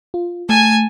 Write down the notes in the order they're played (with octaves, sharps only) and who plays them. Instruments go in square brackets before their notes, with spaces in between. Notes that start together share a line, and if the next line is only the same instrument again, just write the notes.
[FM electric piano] F4
[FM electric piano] A3 [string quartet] G#5 A5 G#6